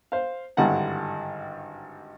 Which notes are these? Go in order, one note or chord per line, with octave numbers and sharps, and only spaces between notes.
C5 F5
G#1 G2 D3 E4 F#5 A#5